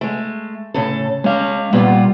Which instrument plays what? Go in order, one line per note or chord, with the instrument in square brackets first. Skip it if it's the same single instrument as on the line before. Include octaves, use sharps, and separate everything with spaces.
[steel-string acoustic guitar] G#3 A3
A2 C#3 A4
[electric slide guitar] G#3 F5 [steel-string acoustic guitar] C#4
[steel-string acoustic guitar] A#2 B3 F4 [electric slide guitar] G3